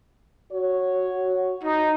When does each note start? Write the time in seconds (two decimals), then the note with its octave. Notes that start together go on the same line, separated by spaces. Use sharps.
0.52 F#4 C#5
1.63 D#4